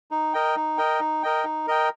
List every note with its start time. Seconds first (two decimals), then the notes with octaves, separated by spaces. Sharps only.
0.11 D#4
0.33 A#4 D#5 G5
0.56 D#4
0.78 A#4 D#5 G5
1.00 D#4
1.23 A#4 D#5 G5
1.44 D#4
1.67 A#4 D#5 G5